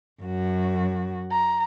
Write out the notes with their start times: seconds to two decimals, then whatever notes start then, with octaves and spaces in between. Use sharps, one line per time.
0.21 F#2 F#4
1.31 A#5